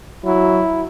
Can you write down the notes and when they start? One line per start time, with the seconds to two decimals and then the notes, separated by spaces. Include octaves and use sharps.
0.25 F#3 E4